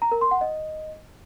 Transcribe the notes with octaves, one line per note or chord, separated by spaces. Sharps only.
A#5
A#4
C6
F#5
D#5